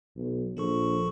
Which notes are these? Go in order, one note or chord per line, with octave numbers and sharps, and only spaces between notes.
B1
A#1 F3 A4 C#6